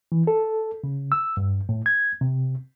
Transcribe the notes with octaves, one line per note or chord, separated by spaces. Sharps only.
E3
A4
C#3
E6
G2
A2
G#6
C3